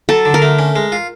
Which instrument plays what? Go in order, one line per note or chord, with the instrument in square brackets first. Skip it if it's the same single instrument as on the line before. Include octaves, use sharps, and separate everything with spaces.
[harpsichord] F#3 [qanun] A4
[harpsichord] D3
[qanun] A#4
[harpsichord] A3
C#4
G#3
F4